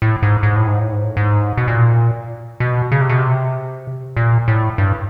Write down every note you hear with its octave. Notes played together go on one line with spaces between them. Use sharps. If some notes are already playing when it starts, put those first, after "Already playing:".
A2
G#2
G#2
A2
G#2
A2
G#2
A2
G#2
B2
A#2
B2
C#3
C3
B2
C3
A#2
A2
G2